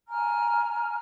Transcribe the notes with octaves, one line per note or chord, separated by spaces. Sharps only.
G#5 A#5 F6